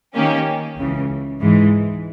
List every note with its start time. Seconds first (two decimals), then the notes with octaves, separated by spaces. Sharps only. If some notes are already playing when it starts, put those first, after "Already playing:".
0.15 D#3 A#3 C#4 G4
0.78 C#2 C#3 E3
1.41 G#2 E3 G#3